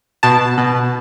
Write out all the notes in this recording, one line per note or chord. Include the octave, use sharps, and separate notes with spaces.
B2 A5
B2